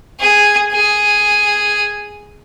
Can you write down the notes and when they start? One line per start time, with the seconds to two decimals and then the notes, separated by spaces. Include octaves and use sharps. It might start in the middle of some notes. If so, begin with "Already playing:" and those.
0.20 G#4
0.72 G#4